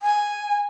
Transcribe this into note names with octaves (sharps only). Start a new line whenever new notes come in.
G#5